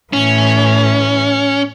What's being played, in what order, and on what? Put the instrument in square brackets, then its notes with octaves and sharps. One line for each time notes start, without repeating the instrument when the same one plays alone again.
[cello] A2 E3 [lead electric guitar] C#4